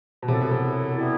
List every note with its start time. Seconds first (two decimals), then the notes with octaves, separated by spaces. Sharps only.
0.22 B2
0.28 F#2 C3 F#3 B3 E4 A4
0.41 B2
0.51 C3
0.97 E3 G3 B3 E4